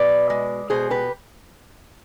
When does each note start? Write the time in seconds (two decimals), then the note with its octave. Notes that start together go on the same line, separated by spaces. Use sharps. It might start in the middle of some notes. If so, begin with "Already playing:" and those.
Already playing: B2 B4 D5
0.30 G#3
0.70 B2 G#4 C5
0.90 G4 B4